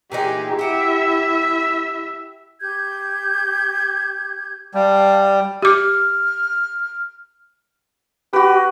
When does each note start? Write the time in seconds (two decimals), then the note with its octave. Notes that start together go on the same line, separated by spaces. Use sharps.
0.12 A#2 E3 D#4 G4 G#4
0.59 E4 G4 E5 F#5 G5
2.60 G4 G6 G#6
4.74 G3 F5 A5
5.63 G4 D6 F6
8.33 F#4 G4 B4